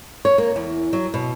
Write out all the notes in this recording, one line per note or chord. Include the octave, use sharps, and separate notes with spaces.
C#5
A#3
E2
F#3
B2